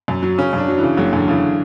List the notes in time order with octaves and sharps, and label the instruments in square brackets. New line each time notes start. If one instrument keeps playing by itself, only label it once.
[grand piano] F#2
F#3
[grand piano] C#3 [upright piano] C#4
[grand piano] F#2 [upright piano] D4
[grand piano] F#3
[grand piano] C#3 [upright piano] E3
[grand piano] F#1 [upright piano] F#3
[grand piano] F#2 [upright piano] D3
[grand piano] C#3 [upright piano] E3